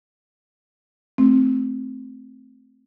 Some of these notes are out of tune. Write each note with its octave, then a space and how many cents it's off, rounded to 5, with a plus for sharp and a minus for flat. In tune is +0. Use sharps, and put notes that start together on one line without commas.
A3 +0 C4 +0